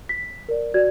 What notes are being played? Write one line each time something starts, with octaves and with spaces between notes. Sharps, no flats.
B6
A#4 D5
F#4 D5 G#6